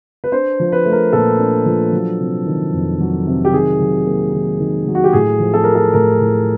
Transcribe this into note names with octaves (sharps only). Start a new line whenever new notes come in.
B4
D4 C5
F3
B4
A3
A#4
A#2 A4
D4
F3
F#3
C3
D#3
F2
F#3
C3
G4
D#3 G#4
F#3
A#3
D#3
D#3
F#3
F#4
G4
A2 G#4
F3
A4
A3 A#4
A4
A2 A#4
A2